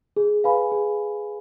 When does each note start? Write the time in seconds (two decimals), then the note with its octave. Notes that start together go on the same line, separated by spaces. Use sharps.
0.17 G#4
0.44 B4 F5 G#5 B5
0.72 G#4